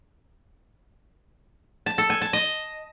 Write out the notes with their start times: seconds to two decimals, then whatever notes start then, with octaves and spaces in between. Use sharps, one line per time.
1.86 A5
1.98 A4
2.10 G#5
2.22 A5
2.33 D#5